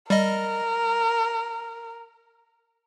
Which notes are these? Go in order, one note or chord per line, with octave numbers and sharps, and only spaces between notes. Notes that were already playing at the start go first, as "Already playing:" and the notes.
G3 A#4 D#5